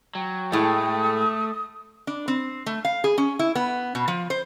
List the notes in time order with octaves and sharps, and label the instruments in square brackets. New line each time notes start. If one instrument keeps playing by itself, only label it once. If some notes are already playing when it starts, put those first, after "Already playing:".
[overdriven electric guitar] F#3 [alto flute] G5
[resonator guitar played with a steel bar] A2 G#3 [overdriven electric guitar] A3 [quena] D#6
[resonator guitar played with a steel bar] D4
C4
A3
F5
G#4
C#4
E4
B3
B2
F3
C5